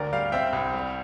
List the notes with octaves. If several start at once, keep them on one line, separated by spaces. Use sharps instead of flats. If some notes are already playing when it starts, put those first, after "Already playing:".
Already playing: D2 A#4 D5
G3 D5 F5
C4 E5 G5
C2
G3